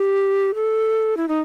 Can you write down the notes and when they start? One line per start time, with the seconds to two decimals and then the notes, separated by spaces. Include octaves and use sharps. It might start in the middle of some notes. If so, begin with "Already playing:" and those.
Already playing: G4
0.55 A4
1.17 E4
1.28 D#4